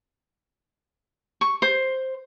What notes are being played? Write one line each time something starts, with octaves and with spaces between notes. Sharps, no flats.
C#6
C5